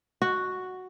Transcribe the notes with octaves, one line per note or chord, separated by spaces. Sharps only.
F#4